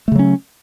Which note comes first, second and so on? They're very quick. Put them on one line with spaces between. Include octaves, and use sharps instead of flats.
A3 C#3 F#3 C#4